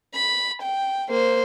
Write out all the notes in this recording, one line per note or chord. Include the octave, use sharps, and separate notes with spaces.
B5
G5
A#3 C5